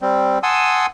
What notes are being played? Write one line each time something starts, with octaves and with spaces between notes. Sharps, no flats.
G3 C4
F#5 G#5 A5 C6 D#6 E6